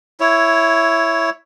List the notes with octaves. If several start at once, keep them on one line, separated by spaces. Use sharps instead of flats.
E4 C#5